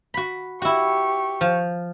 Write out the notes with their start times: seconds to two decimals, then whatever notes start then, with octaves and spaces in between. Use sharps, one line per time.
0.14 F#4 B5
0.62 E4 F#4 G4 C#6
1.41 F3